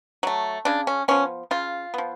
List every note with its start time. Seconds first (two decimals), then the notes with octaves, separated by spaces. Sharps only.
0.23 F#3 A3
0.65 C#3 D4
0.87 C#4
1.08 F3 B3 C#4
1.51 C#3 F4
1.94 F3 B3